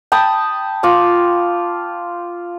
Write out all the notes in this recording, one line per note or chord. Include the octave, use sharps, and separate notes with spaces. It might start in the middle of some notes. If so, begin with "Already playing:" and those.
G5 A5 B5 D#6
F4 D6